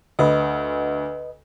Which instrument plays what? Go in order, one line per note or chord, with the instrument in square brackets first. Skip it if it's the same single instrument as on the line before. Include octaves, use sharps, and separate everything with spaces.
[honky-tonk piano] D2 [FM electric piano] B4 D#5